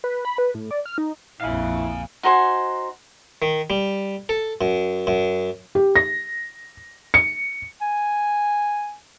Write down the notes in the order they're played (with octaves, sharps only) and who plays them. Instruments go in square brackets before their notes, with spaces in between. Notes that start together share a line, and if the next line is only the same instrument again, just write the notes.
[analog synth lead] B4
B5
B4
A2
D5
F6
D#4
[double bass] A#1 F2 [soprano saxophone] E4 [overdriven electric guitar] F5 G#5
[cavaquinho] D#4 F#4 C5 G#5
[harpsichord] D#3
G3
A4
F#2
F#2
[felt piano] G4
A#6
C#7
[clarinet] G#5